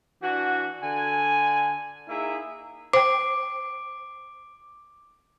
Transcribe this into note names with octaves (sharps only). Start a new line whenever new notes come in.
E3 D4 F#4
D3 G#5
A#3 D#4 E4 G#4 E5
C5 G5 D6